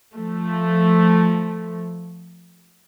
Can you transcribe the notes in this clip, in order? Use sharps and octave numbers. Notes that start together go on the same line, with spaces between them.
F3 A3